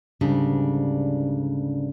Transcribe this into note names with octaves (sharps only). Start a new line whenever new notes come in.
D2 G#2 C#3 G3 D4